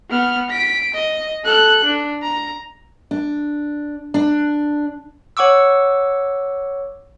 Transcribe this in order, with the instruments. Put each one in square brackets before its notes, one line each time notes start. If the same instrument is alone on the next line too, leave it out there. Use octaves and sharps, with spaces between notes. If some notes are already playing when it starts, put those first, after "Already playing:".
[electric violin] B3 F6
B6 D7
D#5
A4 F#6
D4
A#5
[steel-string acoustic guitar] D4
D4
[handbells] C#5 F#5 C#6 D6 E6